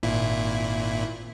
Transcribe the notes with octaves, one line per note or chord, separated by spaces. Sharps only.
G#1 A#2 E4